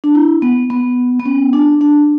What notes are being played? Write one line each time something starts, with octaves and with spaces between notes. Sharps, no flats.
D4
E4
B3
B3
B3
C#4
D4
D4